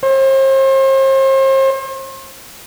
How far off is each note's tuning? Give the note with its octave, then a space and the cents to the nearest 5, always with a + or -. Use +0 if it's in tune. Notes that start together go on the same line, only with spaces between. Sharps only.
C5 +40